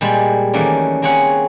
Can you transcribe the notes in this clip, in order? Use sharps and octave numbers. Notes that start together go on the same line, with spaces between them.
A#2 G3 G#3
D#3 E3 A3 A#3 C#4 D5
A#3 C4 G#4 C#5 F#5